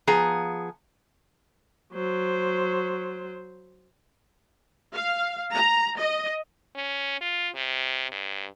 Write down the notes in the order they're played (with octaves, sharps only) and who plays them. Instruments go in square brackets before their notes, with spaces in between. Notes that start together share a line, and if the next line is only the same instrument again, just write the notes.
[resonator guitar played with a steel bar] F3 B3 G#4 A#5
[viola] F#3 C5
[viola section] F5
A#5
D#5
[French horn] C#4
F4
C3
G2